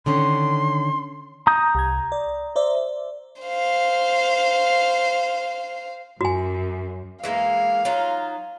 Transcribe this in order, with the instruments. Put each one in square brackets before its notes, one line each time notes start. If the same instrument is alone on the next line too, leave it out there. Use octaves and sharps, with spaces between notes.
[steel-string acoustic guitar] D3 D#3 C#4 [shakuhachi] C6
[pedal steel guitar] A#5 D#6 G6
[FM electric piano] C2 G#6
D5
C5 D5 E5
[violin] C5 F5
[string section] F#2 [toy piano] F#4 G#5
[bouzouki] E3 G#3 A#3 [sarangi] F5
[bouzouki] F#3 D#4 F4